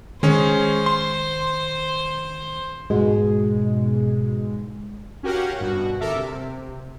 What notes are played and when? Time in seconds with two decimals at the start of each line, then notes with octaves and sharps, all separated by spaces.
0.23 D#3 G#3 C#4 C5
0.86 C6
2.90 G#2 B2 G#3
5.23 C#4 F#4 G4 A#4 F5 F#5
5.60 G2 B2 F#4
6.00 G1 A4 A#4 E5 D6
6.15 C3